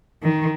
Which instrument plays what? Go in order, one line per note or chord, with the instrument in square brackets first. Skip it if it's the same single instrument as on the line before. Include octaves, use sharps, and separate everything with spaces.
[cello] D#3